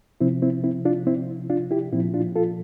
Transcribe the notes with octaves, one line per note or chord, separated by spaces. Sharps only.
C3 F3 C4 E4
C4 E4
C4 E4
D4 F4
C4 E4
D4 F4
E4 G4
A#2 F3 C4 E4
D4 F4
F4 A4